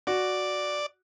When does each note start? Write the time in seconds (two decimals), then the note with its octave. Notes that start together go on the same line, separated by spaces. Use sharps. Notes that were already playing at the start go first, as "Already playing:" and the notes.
0.07 F#4 D5